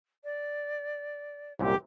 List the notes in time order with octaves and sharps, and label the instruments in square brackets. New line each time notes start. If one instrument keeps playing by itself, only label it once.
[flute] D5
[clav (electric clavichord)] C2 F#2 A#2 [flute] G4